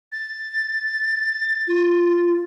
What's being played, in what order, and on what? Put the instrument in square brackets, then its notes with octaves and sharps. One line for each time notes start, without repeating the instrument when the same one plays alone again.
[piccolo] A6
[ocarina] F4